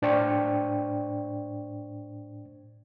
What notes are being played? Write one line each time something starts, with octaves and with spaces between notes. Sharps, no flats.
A2 D4 C5 D5 G5 C#6